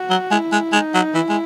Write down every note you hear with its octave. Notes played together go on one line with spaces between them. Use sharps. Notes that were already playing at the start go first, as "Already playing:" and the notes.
Already playing: F#4
F#3
G#3 E4
G#3
G#3 D#4
F#3
E3 E4
G#3